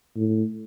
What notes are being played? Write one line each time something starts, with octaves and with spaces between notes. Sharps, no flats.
A2